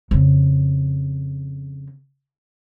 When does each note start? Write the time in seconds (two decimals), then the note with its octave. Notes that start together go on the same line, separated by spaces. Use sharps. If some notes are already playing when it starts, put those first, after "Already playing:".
0.11 F2 C#3